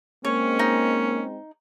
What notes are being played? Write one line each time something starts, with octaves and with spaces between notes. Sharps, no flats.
G#3 A#3 C4 C#4 C#5
D#4